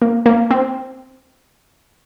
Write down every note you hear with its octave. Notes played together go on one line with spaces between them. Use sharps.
A#3
A#3
C4